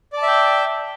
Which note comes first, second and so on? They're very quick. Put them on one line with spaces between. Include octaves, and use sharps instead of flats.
D5 A5 E5 G5